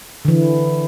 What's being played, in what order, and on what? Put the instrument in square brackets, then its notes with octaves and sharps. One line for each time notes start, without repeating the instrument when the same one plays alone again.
[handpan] D3 E3